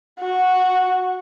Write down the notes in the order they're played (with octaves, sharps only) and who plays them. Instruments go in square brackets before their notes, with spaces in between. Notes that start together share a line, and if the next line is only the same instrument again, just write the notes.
[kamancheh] F#4